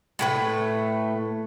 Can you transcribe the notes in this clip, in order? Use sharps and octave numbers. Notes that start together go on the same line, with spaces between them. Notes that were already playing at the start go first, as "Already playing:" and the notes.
A2 A3 B4